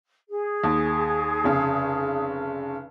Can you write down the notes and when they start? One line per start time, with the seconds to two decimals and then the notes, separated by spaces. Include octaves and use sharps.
0.29 G#4
0.64 D#2
1.44 F1 C#3